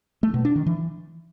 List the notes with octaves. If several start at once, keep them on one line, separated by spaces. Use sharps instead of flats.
A3
B2
D4
D#3
E3